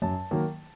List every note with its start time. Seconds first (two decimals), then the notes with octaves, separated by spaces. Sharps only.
0.02 F#2 A5
0.31 D#3 F#3 A#3